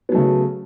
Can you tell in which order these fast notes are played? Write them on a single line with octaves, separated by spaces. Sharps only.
B3 F#3 A3 C#3